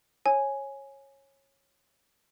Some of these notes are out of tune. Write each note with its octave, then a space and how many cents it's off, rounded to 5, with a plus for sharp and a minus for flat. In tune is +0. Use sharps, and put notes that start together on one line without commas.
C#5 -20 G#5 +5